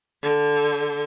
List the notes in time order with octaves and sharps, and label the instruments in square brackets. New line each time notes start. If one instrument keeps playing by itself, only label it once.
[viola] D3